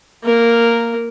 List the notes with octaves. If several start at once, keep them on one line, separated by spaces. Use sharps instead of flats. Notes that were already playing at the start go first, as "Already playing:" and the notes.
A#3 A#4